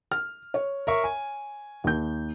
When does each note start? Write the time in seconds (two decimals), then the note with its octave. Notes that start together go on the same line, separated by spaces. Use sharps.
0.12 F6
0.54 C#5
0.87 A#4 E5 C#6
1.04 G#5
1.84 D#2 G6